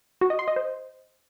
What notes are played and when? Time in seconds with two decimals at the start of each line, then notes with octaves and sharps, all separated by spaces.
0.21 F#4
0.30 D#5
0.39 C6
0.48 D#5
0.56 C5